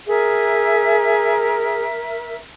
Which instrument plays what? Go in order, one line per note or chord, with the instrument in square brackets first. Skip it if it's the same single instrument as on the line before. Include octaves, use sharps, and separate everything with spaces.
[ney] G#4 [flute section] A#4 E5